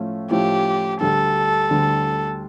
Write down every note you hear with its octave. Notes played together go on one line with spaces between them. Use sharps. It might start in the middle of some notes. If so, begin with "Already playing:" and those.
Already playing: A2 F3 A3 C#4 F4
A2 F3 A3 C#4 F4 G4
D2 D3 G3 A4
D2 D3 G3